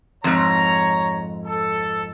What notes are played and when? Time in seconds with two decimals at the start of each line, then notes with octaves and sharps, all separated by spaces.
0.24 F2 G#2 C#5 A#5
1.45 A4